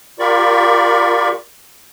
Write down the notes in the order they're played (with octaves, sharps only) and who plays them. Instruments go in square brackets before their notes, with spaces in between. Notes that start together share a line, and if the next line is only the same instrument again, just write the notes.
[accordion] F4 G4 A#4 D5 B5 C#6